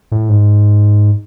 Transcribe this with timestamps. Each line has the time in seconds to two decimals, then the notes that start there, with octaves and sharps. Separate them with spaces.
0.12 A2
0.29 G#2